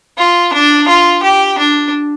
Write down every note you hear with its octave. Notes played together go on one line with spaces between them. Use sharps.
F4
D4
F4
G4
D4